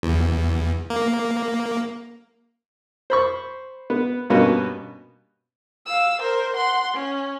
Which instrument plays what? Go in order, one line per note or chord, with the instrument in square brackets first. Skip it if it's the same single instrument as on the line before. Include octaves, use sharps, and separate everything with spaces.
[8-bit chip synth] E2
A#3
[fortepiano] C5 B5 C#6
B3
G2 B2 A#3 B3 C#4 F#4
[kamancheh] F5 E6
A#4 C5
F#5 C6
C#4